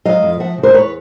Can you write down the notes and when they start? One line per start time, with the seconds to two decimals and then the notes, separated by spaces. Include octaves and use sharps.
0.05 F#3 D#5 F5
0.23 F2
0.40 F3 E5 F#5
0.58 C#3
0.63 A#4 C5
0.74 E2 B4 C#5